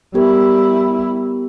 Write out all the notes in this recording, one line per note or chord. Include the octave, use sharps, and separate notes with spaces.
G3 B3 E4 G4 A#4